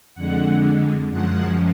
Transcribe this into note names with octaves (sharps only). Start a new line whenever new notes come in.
F2 D3 G#3 F#5
F#2 F3 G#3 F#5